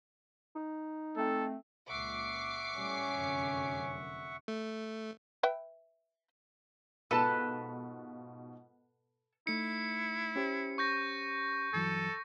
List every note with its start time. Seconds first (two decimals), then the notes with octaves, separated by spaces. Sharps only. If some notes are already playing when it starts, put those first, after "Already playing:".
0.56 D#4
1.17 A3 C4 A4
1.89 C#2 A#2 E5 F#5 C#6 D6 C7
2.75 A2 G3 C#4
3.14 F1 F#2 D3
4.48 A3
5.43 B4 E5 G5
7.11 G#2 B2 F4 A4 B4 A5
9.47 A3 D#4 E4 C#7
10.36 C#4 G4 C5
10.78 C#6 G6 A#6
11.74 G2 E3 F#3 A4